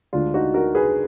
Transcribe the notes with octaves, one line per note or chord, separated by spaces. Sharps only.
D2 D3 G#3 D4 F4
D#4 F#4
F#4 A#4
G#4 B4